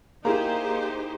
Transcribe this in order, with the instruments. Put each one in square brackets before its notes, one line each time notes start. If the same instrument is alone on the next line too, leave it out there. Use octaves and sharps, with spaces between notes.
[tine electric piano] A#3 [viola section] D#4 G4 C5 [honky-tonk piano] E4 G#4 A#5